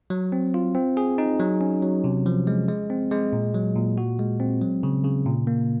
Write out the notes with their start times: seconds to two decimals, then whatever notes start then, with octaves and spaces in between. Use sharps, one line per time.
0.10 F#3
0.32 C4
0.54 F4
0.75 C4
0.97 G#4
1.18 D#4
1.40 F#3
1.61 C#4
1.82 F#3
2.04 C3
2.26 F3
2.47 G#3
2.68 G#3
2.90 C4
3.11 G#3
3.33 A#2
3.54 F#3
3.76 A#2
3.98 F#4
4.19 G#3
4.40 C4
4.61 F#3
4.83 C#3
5.04 C#3
5.26 A#2
5.47 A#3